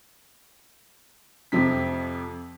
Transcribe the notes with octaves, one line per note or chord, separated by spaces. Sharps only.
F2 C3 F3 B6